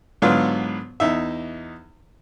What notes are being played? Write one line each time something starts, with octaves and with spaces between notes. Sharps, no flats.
G#2 D3 F#3 B3 F4 F5
E2 D#4 E5